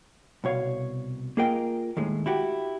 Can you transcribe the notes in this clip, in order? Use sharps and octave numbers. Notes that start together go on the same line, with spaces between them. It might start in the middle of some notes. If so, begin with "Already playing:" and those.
C2 B2 C#5 F5
A#3 F4 G#4 A#4 D#5 G5
D#2 A2 G#3
E4 F#4 G4